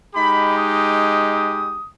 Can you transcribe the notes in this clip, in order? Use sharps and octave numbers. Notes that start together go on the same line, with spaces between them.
G#3 D#4 G4 B5
D#6